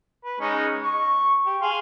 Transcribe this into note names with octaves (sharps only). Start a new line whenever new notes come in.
B4
G#3 C#4 D#4
C#6
G4
G#4 F5 C6